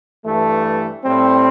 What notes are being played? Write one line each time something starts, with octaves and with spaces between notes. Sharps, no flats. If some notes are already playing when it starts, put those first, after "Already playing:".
G2 E3 A3
A2 G3 C4